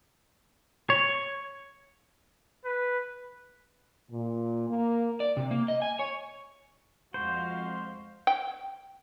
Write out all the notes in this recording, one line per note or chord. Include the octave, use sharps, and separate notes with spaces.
C#5
B4
A#2
A#3
D5
C3
A#3
D#5
G#5
C#5
F2 G#3 F#4 C5 F5
G5